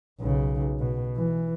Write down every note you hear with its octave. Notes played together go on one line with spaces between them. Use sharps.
B1 C#3
B2
E3